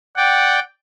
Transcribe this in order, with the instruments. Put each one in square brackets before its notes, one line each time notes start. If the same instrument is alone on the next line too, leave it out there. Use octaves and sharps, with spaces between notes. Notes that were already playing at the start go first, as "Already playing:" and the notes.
[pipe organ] D5 G5 [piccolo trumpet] F#5